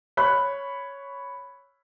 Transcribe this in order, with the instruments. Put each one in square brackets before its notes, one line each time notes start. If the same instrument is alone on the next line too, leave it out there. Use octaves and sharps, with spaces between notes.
[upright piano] C#5 B5 F#6